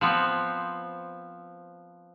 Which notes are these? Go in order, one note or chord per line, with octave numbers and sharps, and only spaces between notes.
F3 B3 C4